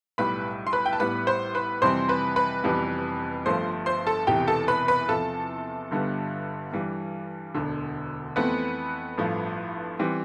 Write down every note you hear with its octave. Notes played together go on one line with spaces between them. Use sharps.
B1 A2 G3 B4 B5
C6
B4 B5
G5
A5
A1 A2 G3 B3 B4 B5
C5 C6
B4 B5
F2 C3 E3 G3 C4 C5 C6
B4 B5
B4 B5
F1 F2 E3 G3 B3
G1 G2 F3 A3 C5 C6
C5 C6
A4 A5
E1 E2 C3 E3 G4 G5
A4 A5
B4 B5
B4 B5
E2 C3 F3 A4 A5
G1 G2 D3 G3 B3
G2 E3 G3
E1 D2 D3
F2 E3 A3 B3 C4 B4
A1 G2 F3 A3
E3 G3 C4